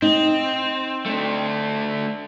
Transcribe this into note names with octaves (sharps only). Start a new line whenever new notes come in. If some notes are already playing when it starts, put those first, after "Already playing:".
C4 D#4
A3 D4